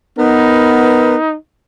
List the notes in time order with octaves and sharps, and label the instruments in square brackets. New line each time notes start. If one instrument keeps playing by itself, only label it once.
[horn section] B3 A#4 [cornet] D#4